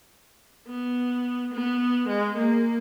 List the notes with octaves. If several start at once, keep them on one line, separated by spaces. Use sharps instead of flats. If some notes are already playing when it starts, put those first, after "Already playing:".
B3
B3
G#3
A#3